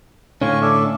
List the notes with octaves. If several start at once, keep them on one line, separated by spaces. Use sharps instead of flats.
A2 D3 C#4 F5 G#5 C#6
A4 D5 E5